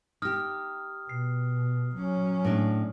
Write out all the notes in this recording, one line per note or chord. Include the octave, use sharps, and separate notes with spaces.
D#4 G4 D#6 F6
B2 C7
F#3 C#4
A2 D4